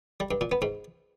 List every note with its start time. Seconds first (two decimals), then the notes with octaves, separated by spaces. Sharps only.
0.20 G3
0.31 G2
0.41 A#2
0.52 B3
0.62 G#2